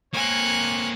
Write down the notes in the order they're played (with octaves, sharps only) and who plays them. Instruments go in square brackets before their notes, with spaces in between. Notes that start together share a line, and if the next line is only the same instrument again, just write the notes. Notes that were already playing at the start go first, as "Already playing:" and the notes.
[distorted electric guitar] A#3 C4 [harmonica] C#5 [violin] G#5 F#6